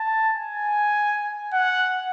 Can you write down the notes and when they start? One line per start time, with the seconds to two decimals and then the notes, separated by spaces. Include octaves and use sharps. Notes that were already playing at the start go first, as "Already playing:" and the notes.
Already playing: A5
0.34 G#5
1.53 F#5